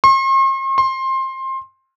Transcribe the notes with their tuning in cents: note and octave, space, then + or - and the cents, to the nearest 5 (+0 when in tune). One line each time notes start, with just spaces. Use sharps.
C6 +45
C6 +20